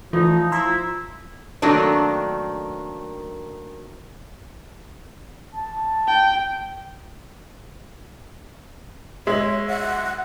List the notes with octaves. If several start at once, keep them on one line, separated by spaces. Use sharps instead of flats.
E3 F3 A3 D#4 F4 D5
E4 A#5 C6 E6
D#3 F#3 A3 A#3 C4 D4
A5
G5
G#3 C#5 E5 F#7
F#5